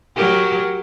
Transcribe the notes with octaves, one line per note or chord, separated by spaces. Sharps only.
F#3 G4 A#4